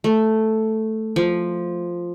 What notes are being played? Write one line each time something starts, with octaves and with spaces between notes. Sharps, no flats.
A3
F3